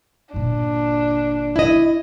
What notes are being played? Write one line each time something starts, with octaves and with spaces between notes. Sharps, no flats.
G1 A#2 D4
E4 D#5